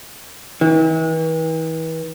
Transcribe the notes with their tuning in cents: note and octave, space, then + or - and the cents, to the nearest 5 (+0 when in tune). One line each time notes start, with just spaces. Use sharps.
E3 -40